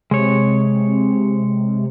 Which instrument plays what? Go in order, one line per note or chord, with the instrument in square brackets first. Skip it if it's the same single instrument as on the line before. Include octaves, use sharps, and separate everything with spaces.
[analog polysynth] C3 [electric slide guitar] G#3 C#5